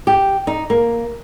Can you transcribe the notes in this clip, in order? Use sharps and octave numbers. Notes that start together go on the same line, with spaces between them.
G4
D#4
A#3